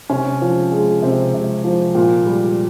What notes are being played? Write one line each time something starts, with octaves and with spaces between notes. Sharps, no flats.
C3 C#4
F3
G#3
C3 C4
C3
F3
A#2
G3